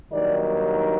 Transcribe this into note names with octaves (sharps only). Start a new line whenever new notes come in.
G2 D#3 F#3 A#3 D#4 D5